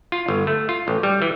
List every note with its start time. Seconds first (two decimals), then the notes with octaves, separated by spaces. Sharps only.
0.12 F4
0.28 G1
0.47 A3
0.69 F4
0.88 A1
1.03 G3
1.22 E3